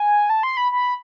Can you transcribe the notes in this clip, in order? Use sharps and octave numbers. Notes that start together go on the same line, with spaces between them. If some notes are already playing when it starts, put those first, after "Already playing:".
Already playing: G#5
A5
C6
B5
B5